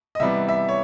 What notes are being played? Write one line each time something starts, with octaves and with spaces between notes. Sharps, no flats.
D#5
C3 E3 G3 B3 E5
E5
C#5